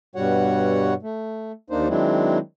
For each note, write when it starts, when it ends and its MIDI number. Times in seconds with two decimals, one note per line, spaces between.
0.16 0.94 43
0.16 0.94 47
0.16 0.94 55
0.16 0.94 66
0.16 0.94 73
0.16 0.94 78
1.03 1.52 57
1.70 1.88 39
1.70 1.88 58
1.70 1.88 62
1.70 1.88 63
1.70 1.88 72
1.89 2.38 51
1.89 2.38 54
1.89 2.38 56
1.89 2.38 60
1.89 2.38 62
1.89 2.38 64